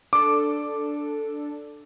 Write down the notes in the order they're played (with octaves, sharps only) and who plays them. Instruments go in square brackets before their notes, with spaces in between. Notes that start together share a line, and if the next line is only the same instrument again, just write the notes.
[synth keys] D4 A4 [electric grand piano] D6